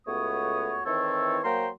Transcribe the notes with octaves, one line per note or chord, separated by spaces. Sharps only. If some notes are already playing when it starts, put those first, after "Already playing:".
C#2 A3 B3 F#4 C#5 D#6
D#3 E3 C4 E4 A4 C#5
F#3 A#3 C5 G5 A#5 C6